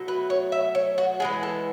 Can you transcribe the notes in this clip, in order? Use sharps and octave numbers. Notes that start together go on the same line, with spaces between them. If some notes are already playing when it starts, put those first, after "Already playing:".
Already playing: B2 F#3 A3
B4
C#5
E5
C#5
F#4
E3 G#3 B3 G#4
A4